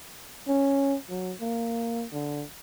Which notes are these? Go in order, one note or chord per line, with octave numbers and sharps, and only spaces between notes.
C#4
F#3
A#3
D3